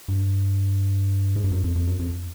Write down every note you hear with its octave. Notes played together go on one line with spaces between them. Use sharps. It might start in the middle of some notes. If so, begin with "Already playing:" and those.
G2
G#2
G2
F#2
F2
F2
F#2
F2